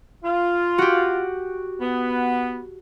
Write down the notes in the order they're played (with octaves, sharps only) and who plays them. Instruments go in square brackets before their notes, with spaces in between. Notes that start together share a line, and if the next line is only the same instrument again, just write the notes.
[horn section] F4
[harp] F#4 G4
[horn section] B3